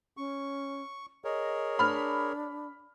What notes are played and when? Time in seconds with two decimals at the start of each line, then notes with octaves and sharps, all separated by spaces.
0.17 C#4 C#6
1.25 G#4 A#4 C#5 D#5
1.79 D4 B5 F6